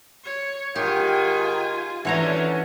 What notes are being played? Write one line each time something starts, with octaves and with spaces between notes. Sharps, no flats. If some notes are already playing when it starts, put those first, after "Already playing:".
C#5
G#2 D#3 F4 G4 G#5
D3 E3 F#3 A3 C#4 D4 C#5 A#5